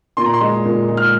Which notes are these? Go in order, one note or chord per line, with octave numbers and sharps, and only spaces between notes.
A#2 C6
A#5
C6
G#3
A#2
G#3
F6